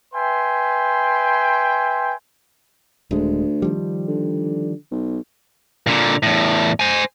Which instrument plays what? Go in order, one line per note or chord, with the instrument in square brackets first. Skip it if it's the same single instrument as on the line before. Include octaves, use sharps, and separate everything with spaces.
[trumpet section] B4 E5 G5 G#5 C6
[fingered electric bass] D#1 G#3 [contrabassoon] D2
[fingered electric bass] D#3 F3 G3
[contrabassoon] D3
B1
[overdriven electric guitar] A#2 D3
E2 A2
C5 G#5